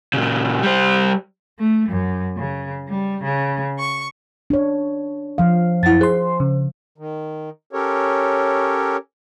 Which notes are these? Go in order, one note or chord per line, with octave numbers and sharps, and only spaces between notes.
A#2 C#3
G3 C5
A3
F#2
C#3
G3
C#3
C#6
D4 C#5
F3 F5
F#2 E4 F#5 A6
G#4 C5 C6
C#3
D#3
C#4 G4 A4 A#4 C#5